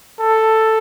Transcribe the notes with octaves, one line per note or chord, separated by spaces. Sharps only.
A4